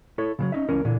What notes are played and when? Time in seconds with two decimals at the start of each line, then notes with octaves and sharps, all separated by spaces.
0.18 E4 A4 C#5
0.39 C#3 F3 F#3
0.52 C#4 D#4 E5
0.68 C#2 E3 C#4 A#4
0.85 A#2 D3 E3